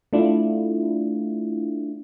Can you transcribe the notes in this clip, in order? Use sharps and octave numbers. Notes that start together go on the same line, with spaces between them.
A3 D4 E4 F4